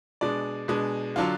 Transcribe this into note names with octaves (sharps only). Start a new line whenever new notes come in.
B2 G#3 D4 D5
B2 G#3 D4
D3 F#3 D4 F4